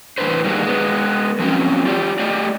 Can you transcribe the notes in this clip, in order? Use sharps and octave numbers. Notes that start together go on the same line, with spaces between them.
E2 A2 C3 D4 B4 C5
D#3 G3 G#3 A#3 B3
G#3 B3
F3 F#3 A#3 C4 C#4
F4 G4 D5
A3 G4 D5 D#5